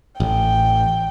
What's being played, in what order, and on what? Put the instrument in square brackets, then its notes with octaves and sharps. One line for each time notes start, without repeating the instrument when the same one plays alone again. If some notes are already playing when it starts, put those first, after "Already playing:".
[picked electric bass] A1 [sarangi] G5